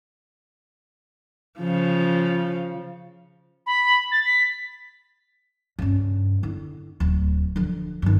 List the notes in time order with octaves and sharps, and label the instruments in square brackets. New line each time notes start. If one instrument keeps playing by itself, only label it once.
[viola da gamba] C#3 F3
[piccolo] B5
A6
B6
[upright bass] G2 C#3
D3 E4
D1 A3
D3 F3
G2 D#3